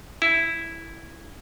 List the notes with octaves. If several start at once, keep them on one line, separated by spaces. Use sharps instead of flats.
E4